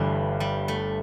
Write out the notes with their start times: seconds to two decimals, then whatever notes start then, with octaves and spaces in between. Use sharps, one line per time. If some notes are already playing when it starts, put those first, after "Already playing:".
Already playing: G1 G2 D3 E3 G3 A3
0.40 G3
0.68 A3